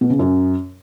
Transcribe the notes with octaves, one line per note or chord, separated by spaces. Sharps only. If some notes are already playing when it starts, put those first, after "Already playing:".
B2
C#3
F#2